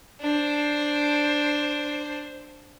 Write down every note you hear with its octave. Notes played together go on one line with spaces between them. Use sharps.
D4 C5